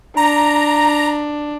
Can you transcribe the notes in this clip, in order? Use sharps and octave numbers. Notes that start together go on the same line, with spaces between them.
D4 A#5